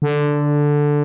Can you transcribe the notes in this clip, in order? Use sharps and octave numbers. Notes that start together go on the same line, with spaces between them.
D3